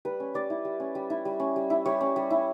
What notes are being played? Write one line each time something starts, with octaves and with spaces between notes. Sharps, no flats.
G3 B4
C#4
G3 D5
E4
G3
C#4
G3
E4
G3
C#4
G3
E4
G3 C#5
C#4
G3
E4